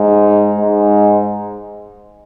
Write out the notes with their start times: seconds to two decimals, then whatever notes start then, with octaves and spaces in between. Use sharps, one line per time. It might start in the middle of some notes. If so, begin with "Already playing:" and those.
Already playing: G#2
0.58 G#2